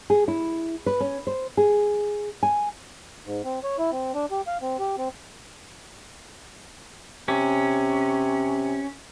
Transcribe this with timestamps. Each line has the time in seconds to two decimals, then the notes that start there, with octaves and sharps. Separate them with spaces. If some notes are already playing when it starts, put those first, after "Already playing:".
0.10 G#4
0.28 E4
0.86 B4
1.00 C#4
1.27 C5
1.57 G#4
2.43 G#5
3.26 G#2
3.44 C4
3.64 C#5
3.79 E4
3.92 C4
4.15 D4
4.31 G4
4.47 F5
4.62 C4
4.79 G4
4.98 C4
7.28 C3 C#4